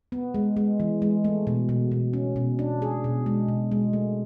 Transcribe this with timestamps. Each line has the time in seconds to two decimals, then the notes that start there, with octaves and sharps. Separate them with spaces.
0.12 B3
0.34 G#3
0.57 G#3
0.80 E3
1.02 G#3
1.25 A3
1.47 B2
1.69 B2
1.92 B2
2.13 C#4
2.36 B2
2.59 D4
2.82 G#4
3.04 B2
3.26 G#3
3.48 B2
3.71 G#3
3.93 A3